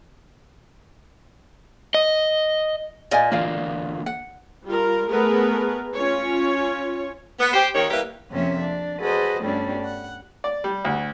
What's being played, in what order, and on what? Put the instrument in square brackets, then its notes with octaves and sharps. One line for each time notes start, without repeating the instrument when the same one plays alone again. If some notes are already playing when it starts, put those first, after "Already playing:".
[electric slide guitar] D#5
[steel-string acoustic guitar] A#2 [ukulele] D5 D#5 G#5
[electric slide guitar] D3 E3 A#3 [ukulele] F4 D5 F5
[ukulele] F#5
[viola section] G3 F4 A#4
A3 B3 G#4 A#4 B4
C#4 F4 C#5
[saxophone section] B3
G4 C5
D#2 D#3 C#5
G3 A#3 E4 G4 A#4 B4
[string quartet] F2 C3 A#3 C#4 E5
D4
F#4 G#4 A4 B4 C5 D#5
D2 G2 G3 B3 C#4 D4
F#5
[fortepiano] D5
G3
D2